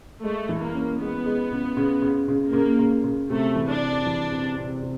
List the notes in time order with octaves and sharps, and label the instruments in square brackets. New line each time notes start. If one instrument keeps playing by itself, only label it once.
[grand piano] G#3 [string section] A3
[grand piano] E3
[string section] A#3
[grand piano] C#4
[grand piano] G#3 [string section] B3
[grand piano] G#3
C#3
C#3
C#3
C#3
[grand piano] C#3 [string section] A#3
[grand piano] C#3
C#3
[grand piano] C3 [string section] A3
[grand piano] E3
[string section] D4
[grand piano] C3
E3
C3
C3
C3